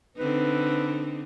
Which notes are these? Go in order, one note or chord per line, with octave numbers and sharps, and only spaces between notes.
D3 C4 D#4 B4